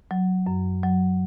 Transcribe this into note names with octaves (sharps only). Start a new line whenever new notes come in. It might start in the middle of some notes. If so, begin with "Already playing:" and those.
F#3
F#2
F#3